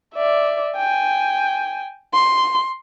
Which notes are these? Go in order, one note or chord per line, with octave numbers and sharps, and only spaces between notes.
D5 E5
G5 G#5
C6